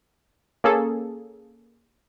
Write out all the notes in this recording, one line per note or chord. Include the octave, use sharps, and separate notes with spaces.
A#3 C#4 G#4 A4